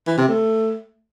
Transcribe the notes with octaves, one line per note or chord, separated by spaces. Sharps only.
E3
C3
A3